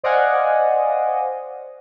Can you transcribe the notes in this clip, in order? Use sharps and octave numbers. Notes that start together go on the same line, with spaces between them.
C5 D5 D#5 F5 F#5 G#5